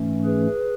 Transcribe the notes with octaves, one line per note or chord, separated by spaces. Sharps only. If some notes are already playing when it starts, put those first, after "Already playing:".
Already playing: G#2 E3 A3 C#4
G#4 B4